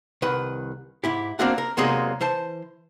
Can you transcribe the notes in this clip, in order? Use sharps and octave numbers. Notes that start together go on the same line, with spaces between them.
C2 D#3 B4 F#5
G#2 E4 G4
A#3 C4 D4 F#4 F5 F#5
A#4
E2 C3 F#3 G#3 A#3 D#4
E3 C5 A5